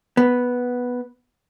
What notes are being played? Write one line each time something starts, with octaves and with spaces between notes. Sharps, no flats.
B3